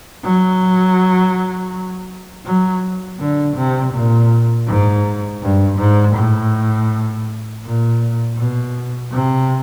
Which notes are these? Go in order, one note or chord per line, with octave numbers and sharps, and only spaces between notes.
F#3
F#3
D3
C3
A#2
G#2
G2
G#2
A2
A#2
B2
C3